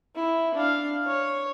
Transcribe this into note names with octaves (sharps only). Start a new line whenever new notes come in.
E4
D4 F5
C#5